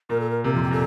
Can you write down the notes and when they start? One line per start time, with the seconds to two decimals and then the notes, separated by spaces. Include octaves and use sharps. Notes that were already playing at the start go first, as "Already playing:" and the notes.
0.09 A#2 A#4
0.20 A4
0.30 A#4
0.44 C3 A#4
0.53 F2 F4
0.62 G4
0.71 A#2 A4